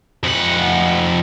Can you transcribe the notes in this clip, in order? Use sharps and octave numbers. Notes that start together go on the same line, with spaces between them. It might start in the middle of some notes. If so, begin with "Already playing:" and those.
F2 F#5